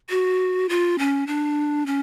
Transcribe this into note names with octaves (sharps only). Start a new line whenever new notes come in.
F#4
F4
C#4
D4
C#4